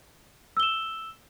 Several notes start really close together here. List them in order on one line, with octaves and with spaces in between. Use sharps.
E6 G7 E7